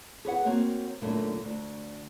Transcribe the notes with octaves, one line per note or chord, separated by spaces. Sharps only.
G#4 B4 C#5 F#5
A#3 C4 F#4 C#5
F#2 A#2 D3 A3 A#3 E4
D2